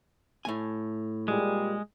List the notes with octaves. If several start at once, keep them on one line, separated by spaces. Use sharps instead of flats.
A2 A3 G#5
A#2 G3 G#3 G#4